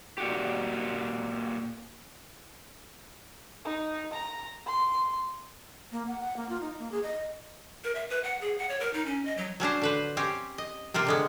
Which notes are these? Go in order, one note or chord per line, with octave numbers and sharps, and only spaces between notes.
A#2 F#4 G4
D#4
A#5
C6
A#3
F#5
F#5
A#3
F4
D#4
A#3
G#4
D#5
A#4
E5
B4
F#5
G#4
F#5
C#5
A#4
D#4
C#4
D#5
F#3
F#3 C#4 D4 C5
D3 B4 C5
C4 C#4 G4
D#5
C3 A#3 C4 F4
D3 G#3 B3